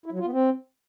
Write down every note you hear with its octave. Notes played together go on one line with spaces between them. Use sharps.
E4
F#3
F4
B3
C4